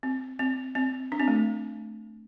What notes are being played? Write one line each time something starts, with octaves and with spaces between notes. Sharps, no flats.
C4
C4
C4
D4
C4
A3